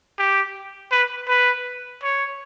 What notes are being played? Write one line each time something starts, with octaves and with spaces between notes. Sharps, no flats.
G4
B4
B4
C#5